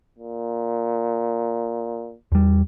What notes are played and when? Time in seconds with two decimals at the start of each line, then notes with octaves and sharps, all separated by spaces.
0.19 A#2
2.32 E2 G3